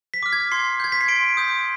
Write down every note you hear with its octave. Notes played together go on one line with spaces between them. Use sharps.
B6
D6 F6
G#6
C6 C7
G6 G#6
B6
C7
C6 D7
D#6 G6